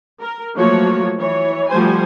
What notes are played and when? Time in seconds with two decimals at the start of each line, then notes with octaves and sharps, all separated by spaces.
0.20 A#4
0.56 F3 F#3 A3 A#3 F#4 C#5
1.18 E3 C#5
1.70 F3 G3 A3 F#4 C5 G#5